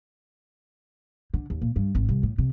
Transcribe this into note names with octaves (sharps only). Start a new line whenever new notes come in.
D3
D#2
A#2
G2
G#1
C2
A2
C3